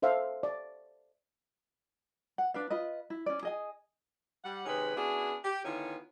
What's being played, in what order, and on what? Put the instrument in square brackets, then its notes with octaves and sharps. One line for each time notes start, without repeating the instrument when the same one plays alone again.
[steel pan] A4 C5 E5 F5
D5
[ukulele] F#5
D4 B4 F5
F4 B4 D#5
E4
C#4 D5
G#4 D#5 G#5
[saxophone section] G3 F#5
C3 D#3 G#3 C#4 G#4 B4
B3 C#4 D4 E4 F#4 G#4
G4
D3 D#3 B3 C#4 E4 F4